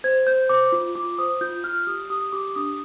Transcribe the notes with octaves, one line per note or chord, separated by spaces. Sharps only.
C5 G#6
C5 G6
C5 D6
F4
F4 D6
C5 D#6
F4 G6
F4 F6
G4 D#6
G4 D#6
G4 D6
D4 D#6